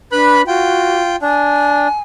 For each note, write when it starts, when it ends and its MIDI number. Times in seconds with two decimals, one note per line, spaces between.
0.12 0.47 62
0.12 0.42 71
0.12 0.42 83
0.12 0.42 90
0.47 1.16 65
0.47 1.02 66
0.47 1.16 79
1.22 1.88 62
1.22 2.00 80